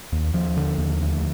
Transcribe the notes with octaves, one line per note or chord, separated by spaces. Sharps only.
D#2
D#2 F3
D3
D#2
D2